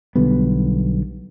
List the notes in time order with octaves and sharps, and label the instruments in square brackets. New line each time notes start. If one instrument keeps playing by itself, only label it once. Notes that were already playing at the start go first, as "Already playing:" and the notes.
[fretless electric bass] B1 D3 G3 B3